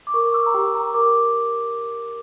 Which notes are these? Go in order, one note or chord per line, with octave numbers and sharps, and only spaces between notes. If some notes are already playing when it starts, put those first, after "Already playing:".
D6
A#4 C#6
D6
E6
A#5
G4 G5
A#5
A#4 D6